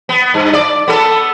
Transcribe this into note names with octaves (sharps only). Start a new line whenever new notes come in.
B3
G2
D5
B3 A4